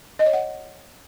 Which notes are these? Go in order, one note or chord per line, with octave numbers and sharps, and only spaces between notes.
D#5
C#5
F#5